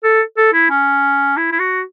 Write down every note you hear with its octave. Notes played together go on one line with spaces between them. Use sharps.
A4
A4
E4
C#4
E4
E4
F#4